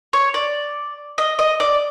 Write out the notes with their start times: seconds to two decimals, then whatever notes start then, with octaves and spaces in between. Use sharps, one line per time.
0.13 C#5
0.34 D5
1.18 D#5
1.39 D#5
1.60 D5